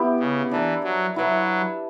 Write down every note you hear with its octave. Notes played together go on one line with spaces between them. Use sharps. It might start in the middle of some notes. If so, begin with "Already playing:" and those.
Already playing: B3 E4 G4
C#3
E3 D4 A#4 D5
F#3
F#3 E4 B4 E5